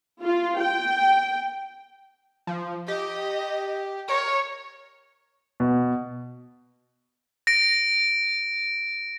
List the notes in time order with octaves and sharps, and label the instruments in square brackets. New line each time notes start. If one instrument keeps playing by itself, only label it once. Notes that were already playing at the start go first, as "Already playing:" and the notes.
[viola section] F4
G5
[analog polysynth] F3
[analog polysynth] G4 [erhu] D#5
[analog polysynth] A#4 [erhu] C#5
[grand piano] B2
[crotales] A#6 D7